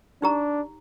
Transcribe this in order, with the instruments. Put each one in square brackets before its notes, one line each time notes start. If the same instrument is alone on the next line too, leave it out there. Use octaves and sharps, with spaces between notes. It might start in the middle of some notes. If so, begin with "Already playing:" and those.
[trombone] D4 [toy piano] D#4 G4 A#5